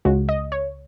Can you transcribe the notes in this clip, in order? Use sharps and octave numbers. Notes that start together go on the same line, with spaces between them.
C#2 C#3 G#3 F#4
D#5
C#5